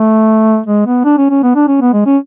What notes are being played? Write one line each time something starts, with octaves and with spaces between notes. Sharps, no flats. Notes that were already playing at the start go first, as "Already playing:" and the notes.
Already playing: A3
G#3
B3
D4
C#4
C#4
B3
D4
C#4
B3
G#3
C#4